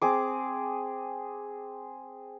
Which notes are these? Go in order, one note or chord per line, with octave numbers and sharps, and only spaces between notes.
C4 G#4 D6